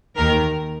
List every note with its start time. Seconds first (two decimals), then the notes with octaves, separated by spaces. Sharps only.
0.16 D#2 D#3 A#4